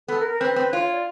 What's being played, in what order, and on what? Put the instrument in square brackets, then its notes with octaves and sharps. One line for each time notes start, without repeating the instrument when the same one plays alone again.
[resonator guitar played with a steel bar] B3 [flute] A4
[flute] A#4
A#4
[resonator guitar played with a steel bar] C4 [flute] B4
[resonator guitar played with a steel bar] C4
[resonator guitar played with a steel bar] F4 [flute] C#5
[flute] C#5
D5